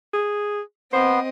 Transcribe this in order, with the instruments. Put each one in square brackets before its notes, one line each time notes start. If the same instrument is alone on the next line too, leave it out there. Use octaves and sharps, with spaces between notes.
[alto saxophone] G#4
[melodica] B3 [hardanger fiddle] C4 D#5 [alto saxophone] C5